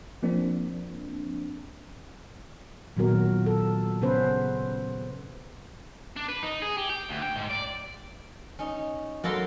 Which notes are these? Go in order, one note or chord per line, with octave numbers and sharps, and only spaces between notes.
F3 A#3 C4 D4
A#2 D#3 F#3 B3 F#4 A#4
A4
C#3 B3 C#4 B4 C5
D4
B4
D#4
G#4
G4
G5
D2
G5
G#2
D5
C#4 D#4
F#3 A#3 A4 F5 B5 C6